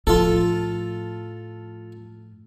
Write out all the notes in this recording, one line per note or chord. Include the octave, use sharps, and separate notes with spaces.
A2 F3 F4 A4